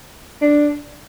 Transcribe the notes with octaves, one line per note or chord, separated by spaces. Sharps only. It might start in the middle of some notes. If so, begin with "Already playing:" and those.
D4